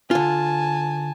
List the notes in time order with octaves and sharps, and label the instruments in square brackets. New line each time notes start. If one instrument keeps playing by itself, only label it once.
[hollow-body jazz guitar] D3 F4 [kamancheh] G#5 A5